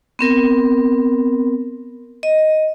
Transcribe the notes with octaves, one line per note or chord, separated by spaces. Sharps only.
B3 C4 A#4
D#5